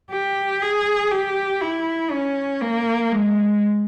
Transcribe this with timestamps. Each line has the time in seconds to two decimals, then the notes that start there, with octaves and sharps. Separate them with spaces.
0.11 G4
0.62 G#4
1.11 G4
1.61 E4
2.10 C#4
2.61 A#3
3.11 G#3